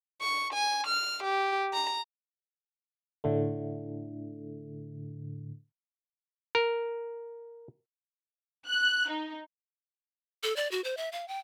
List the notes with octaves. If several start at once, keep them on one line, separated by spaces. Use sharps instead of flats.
C#6
G#5
F6
G4
A#5
A2 D3 A3
A#4
F#6
D#4
A4
D5
F#4
C5
E5
F5
G5